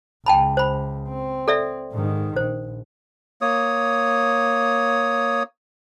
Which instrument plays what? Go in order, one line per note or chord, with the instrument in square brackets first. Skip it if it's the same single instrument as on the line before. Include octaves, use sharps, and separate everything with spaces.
[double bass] C#2 [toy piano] G5 A5 B5
[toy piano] C5 B5
[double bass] C4
[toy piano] A4 D5 E5
[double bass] G#2 D#3
[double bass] A#1 [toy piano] C5
[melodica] A#3 C#5 D#6